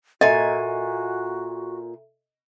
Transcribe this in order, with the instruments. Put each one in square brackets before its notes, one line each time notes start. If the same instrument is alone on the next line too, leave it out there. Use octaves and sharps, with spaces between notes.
[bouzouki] A#2 G#5 [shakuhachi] F#4 [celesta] A4 E5 [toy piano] D#5